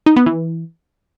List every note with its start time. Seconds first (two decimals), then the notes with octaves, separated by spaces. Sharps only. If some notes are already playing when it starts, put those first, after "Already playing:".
0.06 D#4
0.16 B3
0.26 E3